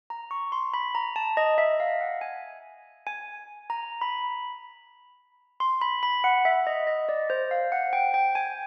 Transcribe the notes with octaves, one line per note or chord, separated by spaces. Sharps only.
A#5
C#6
C6
B5
A#5
A5
D#5
E5
F5
F#5
G#5
G#5
A#5
B5
C6
B5
B5
F#5
E5
D#5
D#5
D5
C5
F5
F#5
G5
G5
G#5